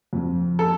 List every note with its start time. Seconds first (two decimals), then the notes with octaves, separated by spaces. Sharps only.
0.13 F2
0.59 A4